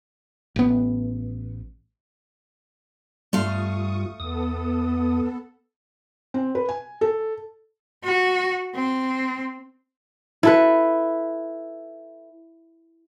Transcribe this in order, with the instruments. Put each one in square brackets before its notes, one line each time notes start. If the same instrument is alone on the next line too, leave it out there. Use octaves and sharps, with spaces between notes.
[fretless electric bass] A1 B3
[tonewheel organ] G2 G3 F4 [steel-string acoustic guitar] A3 F5 [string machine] C#6 D#6
[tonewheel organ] E2 D#6 [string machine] B3 A4
[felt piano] C4
B4
G#5
A4
[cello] F#4
C4
[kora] E4 A4 B4